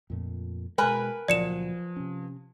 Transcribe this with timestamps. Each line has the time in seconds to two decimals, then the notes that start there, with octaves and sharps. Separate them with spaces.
0.10 F2 A#2 A3
0.78 B2 G#3 A#4 B4 G#5
1.28 C#2 A#2 F3 F#3 D5 C#7 E7
1.96 C3 C#4